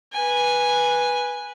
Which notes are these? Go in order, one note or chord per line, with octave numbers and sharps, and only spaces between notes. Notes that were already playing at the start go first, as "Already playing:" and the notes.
B4 G#5